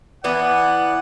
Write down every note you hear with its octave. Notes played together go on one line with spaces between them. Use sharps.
E3 B3 D5 F#5